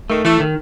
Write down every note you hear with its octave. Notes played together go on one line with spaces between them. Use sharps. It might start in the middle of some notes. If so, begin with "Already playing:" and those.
D#3 A3
E3 A3
D#3